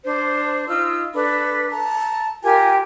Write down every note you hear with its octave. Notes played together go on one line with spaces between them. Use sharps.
D4 C5
D#4 F4 E6
D4 A4 B4 B5
A5 A#5
F4 G4 A#4 G#5